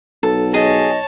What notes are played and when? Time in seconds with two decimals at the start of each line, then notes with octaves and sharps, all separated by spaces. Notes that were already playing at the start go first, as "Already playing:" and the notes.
0.23 B1 A4
0.54 G#4 C#5 D#5 A5